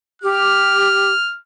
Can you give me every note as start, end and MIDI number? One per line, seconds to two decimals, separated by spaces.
0.22 1.11 67
0.22 1.38 89